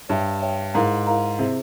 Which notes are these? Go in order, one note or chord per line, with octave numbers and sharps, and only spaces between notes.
G2 C#5 E5 G5
C#5 E5 G5
G#2 E4 A#4 F5 A#5
E4 A#4 F5 A#5
C3 E4 G#4 C5 E5